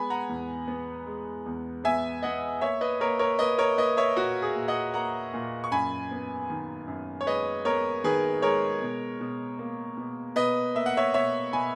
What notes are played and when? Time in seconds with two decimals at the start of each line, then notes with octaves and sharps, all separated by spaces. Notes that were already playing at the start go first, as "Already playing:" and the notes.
Already playing: G#3 B3 G#5 B5
0.10 F#5 A#5
0.29 E2
0.68 B3
1.06 G#3
1.46 E2
1.84 B3 E5 G#5
2.23 B3 D#5 F#5
2.61 A#3 C#5 E5
2.81 B4 D#5
3.00 A#3 A#4 C#5
3.19 A#4 C#5
3.39 A#3 B4 D#5
3.58 A#4 C#5
3.77 A#3 B4 D#5
3.97 C#5 E5
4.17 A#2 F#4
4.42 G#4
4.55 A#2
4.68 D#5 F#5
4.94 A#3 F#5 A#5
5.34 A#2
5.64 C#6
5.71 F#2 G#5 B5
6.11 B3
6.50 D#3
6.87 F#2
7.21 C#5
7.26 G#3 B4 D#5
7.65 B3 A#4 C#5
8.04 D#3 G#4 B4
8.42 G#3 A#4 C#5
8.82 B2
9.21 B2
9.59 A#3
9.97 B2
10.36 B2 B4 D#5
10.75 A#3 E5
10.86 F#5
10.97 C#5 E5
11.14 B2 C#5 E5
11.53 B2 G#5 B5